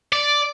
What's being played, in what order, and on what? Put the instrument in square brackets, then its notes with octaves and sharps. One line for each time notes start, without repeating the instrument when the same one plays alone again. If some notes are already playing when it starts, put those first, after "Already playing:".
[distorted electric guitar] D5